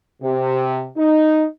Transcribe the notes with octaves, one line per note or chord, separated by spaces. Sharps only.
C3
D#4